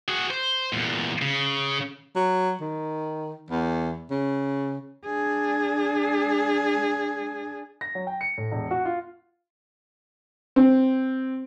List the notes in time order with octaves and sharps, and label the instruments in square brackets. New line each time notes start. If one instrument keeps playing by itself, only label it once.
[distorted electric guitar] F#4 G#4
C5
E2 A#2
C#3
[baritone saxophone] F#3
D#3
E2
C#3
[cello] D4 G#4
[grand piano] A#6
F#3
G5
C#7
A2
E1
F#4
F4
[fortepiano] C4